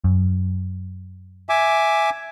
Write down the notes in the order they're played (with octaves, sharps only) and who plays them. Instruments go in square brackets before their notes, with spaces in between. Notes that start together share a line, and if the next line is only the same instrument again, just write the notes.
[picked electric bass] F#2
[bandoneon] E5 G#5 D6